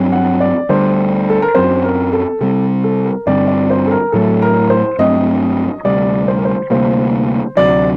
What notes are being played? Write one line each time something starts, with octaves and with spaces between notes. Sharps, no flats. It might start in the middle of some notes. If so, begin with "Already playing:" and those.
Already playing: G2 F#3 C4
F#5
D5
D2 D3 G3 D4 C5
A4
A#4
F#2 F#3 C4 C5
A#4
A4
C3 G3 C4 A4
A4
A#4
G2 D3 G3 C4 D5
D5
C5
A4
A#4
A2 F#3 A3 A4
A#4
C5
G2 F#3 A3 C4 D#5
D2 C3 G3 D5
C5
A#4
C5
D2 C3 G3 A#3 C5
D2 C3 F#3 D5